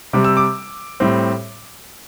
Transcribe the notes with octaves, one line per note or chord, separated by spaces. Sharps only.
C3 G3 C4 D6
E6
D6
A2 G3 C4